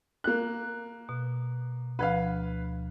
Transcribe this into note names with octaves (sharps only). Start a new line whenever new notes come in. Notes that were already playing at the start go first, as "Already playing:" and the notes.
A#3 F#6
B2
D2 F3 B4 F5